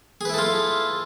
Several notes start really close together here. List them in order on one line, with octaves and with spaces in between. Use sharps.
G#4 B4 E4 A4 F4